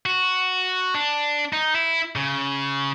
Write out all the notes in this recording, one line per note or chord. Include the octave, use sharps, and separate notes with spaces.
F#4
D4
D#4
E4
C#3